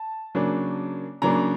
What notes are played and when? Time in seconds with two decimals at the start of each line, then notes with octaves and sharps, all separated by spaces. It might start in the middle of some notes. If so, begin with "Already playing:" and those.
Already playing: A5
0.35 C#3 F#3 A#3 D4
1.22 C#3 F#3 A#3 D4 A#5